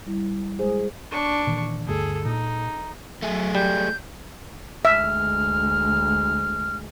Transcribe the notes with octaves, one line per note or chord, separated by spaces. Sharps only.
G3 E4
G#3 G#4 C5
D4 C#6
A#2 D#3 E3
D2 G2 A3 G#4 A4
A#2 D#4
F#3 A3 G#4 E5
G3 G6
D2 G#3 E5 F6